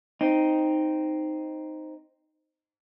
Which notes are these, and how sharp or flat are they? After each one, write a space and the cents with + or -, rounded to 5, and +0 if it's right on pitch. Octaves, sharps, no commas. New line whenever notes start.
C4 +0 D#4 +0